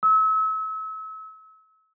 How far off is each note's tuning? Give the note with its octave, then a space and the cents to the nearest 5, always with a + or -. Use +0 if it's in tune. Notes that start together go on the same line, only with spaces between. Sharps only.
E6 -35